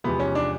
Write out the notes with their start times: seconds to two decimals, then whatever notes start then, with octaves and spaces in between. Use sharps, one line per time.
0.04 E2 C3 F3 G#3 B3
0.20 C#4
0.35 D4